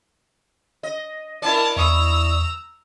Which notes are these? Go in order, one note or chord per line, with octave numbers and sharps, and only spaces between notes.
D#5
E4 A#4 D5 A5
E2 A#5 C#6 D#6 E6